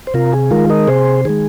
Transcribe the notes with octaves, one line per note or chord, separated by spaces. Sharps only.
C5
C3 F4 A#4
G#4
D#3 G#3 F4 A#4
A#4 D#5
C3 G#4 C5
D#3 G#3 G#4